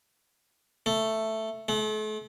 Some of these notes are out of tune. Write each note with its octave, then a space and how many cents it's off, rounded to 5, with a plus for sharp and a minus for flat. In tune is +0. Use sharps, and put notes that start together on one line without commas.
A3 +5
A3 -40